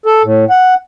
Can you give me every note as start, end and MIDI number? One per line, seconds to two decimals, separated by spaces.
0.06 0.22 69
0.24 0.45 45
0.50 0.74 78